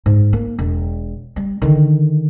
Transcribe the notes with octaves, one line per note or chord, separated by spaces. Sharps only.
G#2
A#3
E1
G3
D3 D#3